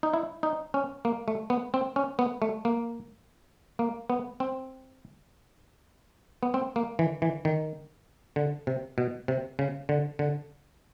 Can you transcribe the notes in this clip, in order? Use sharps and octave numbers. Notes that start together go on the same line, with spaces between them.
D#4
E4
D#4
C#4
A#3
A3
B3
C4
C#4
B3
A3
A#3
A#3
B3
C4
B3
C4
A#3
E3
E3
D#3
D3
C3
B2
C3
C#3
D3
D3